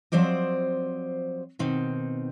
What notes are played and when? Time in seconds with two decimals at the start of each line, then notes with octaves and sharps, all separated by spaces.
0.12 F3 F#3 C4 C5 D5 D#5
1.59 B2 D#3 C4 D#4